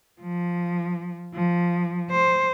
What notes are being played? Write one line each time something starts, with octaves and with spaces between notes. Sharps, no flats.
F3
F3
C5